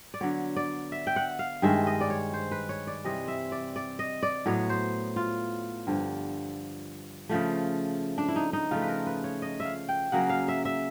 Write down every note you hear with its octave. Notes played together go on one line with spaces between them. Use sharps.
D5
D3 F#3 B3 C#5
D5
E5
G5
F#5
F5
G2 D#3 G#3 E5
D#5
D5
C#5
C5
B4
C#5
D5
C3 E3 G3 C4 D#5
E5
D5
D5
D#5
D5
A2 F#3 B3 C#5
C5
F4
G2 D3 F3
C#3 F3 A3
D4
E4
D#4
D#4
C#3 F3 A3 F4
B4
A#4
B4
C#5
D#5
E5
F5
G5
C#3 F#3 A#3 C#4 F#5
F5
E5
E5